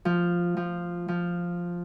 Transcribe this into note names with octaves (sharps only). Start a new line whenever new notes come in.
F3
F3
F3